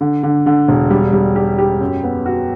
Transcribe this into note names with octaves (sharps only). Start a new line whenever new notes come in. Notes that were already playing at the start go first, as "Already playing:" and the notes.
D3
D3
D3
E1
G3
G3
G4
G4
F#2
B3
F#4